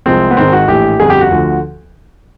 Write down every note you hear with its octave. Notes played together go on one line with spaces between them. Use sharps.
C2 C3 F3 G#3 C4
B3
G#1 G#2 D#3 G#3 C4
F#4
A#1 A2 E3 G4
G1 F2 D3 G#4
G4
F#4
D2 D3 F3